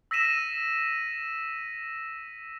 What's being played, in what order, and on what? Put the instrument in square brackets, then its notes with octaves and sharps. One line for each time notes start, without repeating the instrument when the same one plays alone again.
[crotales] E6 A#6 B6 D#7 E7